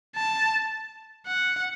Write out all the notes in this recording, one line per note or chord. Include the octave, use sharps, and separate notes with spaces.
A5
F#5